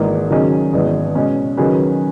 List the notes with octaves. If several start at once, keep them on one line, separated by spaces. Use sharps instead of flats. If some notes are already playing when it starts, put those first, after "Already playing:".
Already playing: G#1 G#2 E3 A#3
D#3 F#3 C#4 G#4 D#5
G#1 G#2 E3 B3
B2 G#3 C#4
D#3 F#3 C#4 G#4 B4